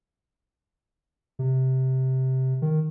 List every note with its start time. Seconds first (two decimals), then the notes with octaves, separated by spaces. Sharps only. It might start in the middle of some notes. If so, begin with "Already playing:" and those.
1.39 C3
2.62 D#3